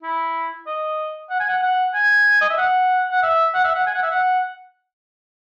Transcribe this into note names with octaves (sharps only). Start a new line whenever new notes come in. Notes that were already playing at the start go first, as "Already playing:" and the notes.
E4
D#5
F#5
G#5
F#5
F#5
G#5
D#5
E5
F#5
F#5
E5
F#5
E5
F#5
G#5
F#5
E5
F#5